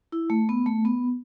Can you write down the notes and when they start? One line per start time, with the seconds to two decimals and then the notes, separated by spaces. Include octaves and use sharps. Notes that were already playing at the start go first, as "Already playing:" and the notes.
0.12 E4
0.30 A3
0.49 B3
0.66 A3
0.85 B3